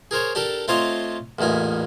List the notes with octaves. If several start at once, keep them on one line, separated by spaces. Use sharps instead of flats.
G#4 A#4 C5 C#5
D4 G4 A4 A#4
A3 C4 F4 C#5 D#5 F5
A1 E2 A#2 D#4 G#5